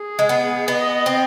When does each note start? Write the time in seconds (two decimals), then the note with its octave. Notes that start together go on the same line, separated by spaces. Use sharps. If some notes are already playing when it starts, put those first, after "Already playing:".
Already playing: G#4
0.19 G#3
0.29 B3
0.68 B3 D#5
1.06 C4